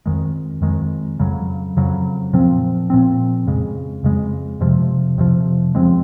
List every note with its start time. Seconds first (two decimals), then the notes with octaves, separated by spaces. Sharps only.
0.06 F2 D#3 G#3
0.62 F2 D#3 G#3
1.20 F2 C#3 F#3
1.77 F2 C#3 F#3
2.33 A#2 F3 C4
2.90 A#2 F3 C4
3.47 F2 C#3 G#3
4.04 F2 C#3 G#3
4.61 F2 C3 F3
5.18 F2 C3 F3
5.75 C#3 F3 G#3 C4